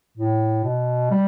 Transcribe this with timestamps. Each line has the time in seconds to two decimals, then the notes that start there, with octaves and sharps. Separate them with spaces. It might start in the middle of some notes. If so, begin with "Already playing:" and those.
0.17 A2
0.64 B2
1.11 G3